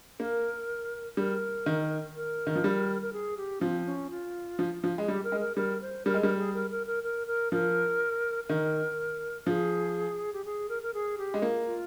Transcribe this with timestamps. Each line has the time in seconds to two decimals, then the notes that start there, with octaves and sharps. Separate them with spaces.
0.20 A#3 A#4
1.17 G3 A#4
1.66 D#3
2.15 A#4
2.47 D#3
2.56 F3
2.64 G3
3.02 A#4
3.13 G#4
3.37 G4
3.61 F3 C4
3.86 C#4
4.10 F4
4.59 F3
4.84 F3
4.98 G#3
5.08 G3 G4
5.24 A#4
5.32 G#3
5.40 A#4
5.57 G3 A#4
5.81 C5
6.05 G3 A#4
6.14 G#3
6.22 G3 A#4
6.38 G#4
6.54 A#4
6.70 A#4
6.87 A#4
7.03 A#4
7.27 A#4
7.52 F3 A#4
8.49 D#3 A#4
9.47 F3 G#4
10.33 G4
10.45 G#4
10.69 A#4
10.82 A#4
10.94 G#4
11.18 G4
11.34 G#3
11.42 A#3 F4
11.66 F4